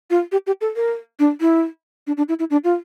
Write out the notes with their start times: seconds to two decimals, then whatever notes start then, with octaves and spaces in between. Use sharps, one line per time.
0.10 F4
0.32 G4
0.47 G4
0.61 A4
0.76 A#4
1.19 D4
1.41 E4
2.07 D4
2.17 D4
2.29 E4
2.39 E4
2.50 D4
2.64 F4